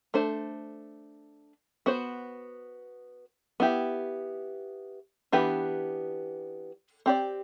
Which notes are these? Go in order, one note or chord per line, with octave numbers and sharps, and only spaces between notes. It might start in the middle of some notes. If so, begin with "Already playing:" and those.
A3 D4 A4 C5
B3 F#4 C5
B3 E4 G4
E3 B3 D4 G4 B4
C4 G4 D5